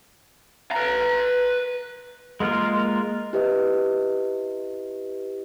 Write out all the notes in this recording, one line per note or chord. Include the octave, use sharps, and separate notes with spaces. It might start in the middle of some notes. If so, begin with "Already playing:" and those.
B4 A#5
G#3 A#3 F4 A#4
E4 G4 B4 D#5